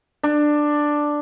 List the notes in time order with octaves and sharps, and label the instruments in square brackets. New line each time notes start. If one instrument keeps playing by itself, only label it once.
[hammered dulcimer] D4